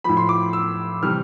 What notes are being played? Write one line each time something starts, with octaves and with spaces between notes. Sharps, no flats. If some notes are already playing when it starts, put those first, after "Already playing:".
A2 F3 B5
C6
D6
E6
C3 E3 G3 F6